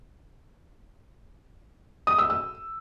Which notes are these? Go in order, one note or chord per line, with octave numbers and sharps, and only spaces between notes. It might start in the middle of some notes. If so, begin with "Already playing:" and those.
D#6
E6
E6